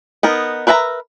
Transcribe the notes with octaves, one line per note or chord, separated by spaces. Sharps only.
B3 D#4 A#4
A#4 B4 E5 A5 A#5